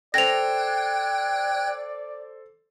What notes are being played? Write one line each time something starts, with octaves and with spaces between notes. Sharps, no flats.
A4 C5 D5 G5 F#6 G#6 A#6 F7